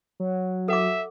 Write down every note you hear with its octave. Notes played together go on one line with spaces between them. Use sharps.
F#3
A4 E5 F#5 D6